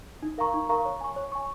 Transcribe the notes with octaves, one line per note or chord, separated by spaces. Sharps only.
D#4
A#4 F5 A#5 C#6
D#4
A#4 F5 A#5 C#6
C#5
G#5 C#6
C#5
G#5 C#6